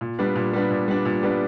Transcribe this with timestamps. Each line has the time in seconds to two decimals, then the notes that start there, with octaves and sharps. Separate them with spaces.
0.01 A#2
0.19 G3 B3 D4
0.36 A#2
0.53 G3 B3 D4
0.71 A#2
0.88 G3 B3 D4
1.05 A#2
1.23 G3 B3 D4